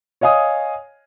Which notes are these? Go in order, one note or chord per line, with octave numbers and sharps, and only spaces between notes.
C#5 D#5 F5 G#5 D#6